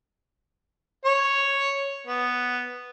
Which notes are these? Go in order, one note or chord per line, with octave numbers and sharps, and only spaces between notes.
C#5
B3